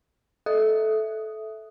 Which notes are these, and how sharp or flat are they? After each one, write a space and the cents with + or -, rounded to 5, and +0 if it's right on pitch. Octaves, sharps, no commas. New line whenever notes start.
A4 -15 E5 +0 D#6 +0